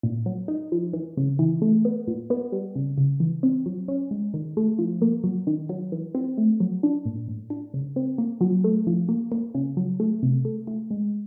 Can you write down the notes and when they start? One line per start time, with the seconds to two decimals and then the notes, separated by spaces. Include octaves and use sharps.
0.03 A#2
0.26 F#3
0.48 D#4
0.72 F3
0.93 E3
1.17 C#3
1.39 E3
1.62 A3
1.85 B3
2.08 A#2
2.30 B3
2.52 G3
2.75 C#3
2.98 C#3
3.20 E3
3.43 C4
3.66 F#3
3.88 C#4
4.11 G#3
4.34 D#3
4.57 A3
4.79 F3
5.02 A#3
5.24 F#3
5.47 D#3
5.69 F#3
5.92 E3
6.15 C4
6.38 A3
6.60 F#3
6.83 D4
7.05 A#2
7.28 A2
7.50 D4
7.74 C#3
7.96 C4
8.18 A#3
8.41 F#3
8.64 A3
8.87 F3
9.09 A#3
9.32 A#3
9.55 C#3
9.77 F#3
10.00 A3
10.23 C3
10.45 A3
10.67 A3
10.91 G#3